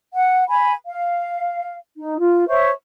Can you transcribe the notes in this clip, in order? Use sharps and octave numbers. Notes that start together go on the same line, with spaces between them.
F#5
G#5 B5
F5
D#4
F4
C5 C#5 E5 C#6